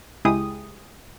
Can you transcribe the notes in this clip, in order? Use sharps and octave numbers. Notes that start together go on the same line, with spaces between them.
C#2 G#3 E4 G4 G#4 D#6